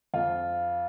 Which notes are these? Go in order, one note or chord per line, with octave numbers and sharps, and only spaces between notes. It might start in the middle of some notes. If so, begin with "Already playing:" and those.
F2 F4